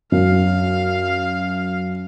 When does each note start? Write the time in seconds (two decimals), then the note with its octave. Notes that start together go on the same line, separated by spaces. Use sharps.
0.12 F#2 F5